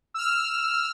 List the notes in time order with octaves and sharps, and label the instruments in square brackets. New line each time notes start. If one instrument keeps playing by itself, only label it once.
[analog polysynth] E6 F6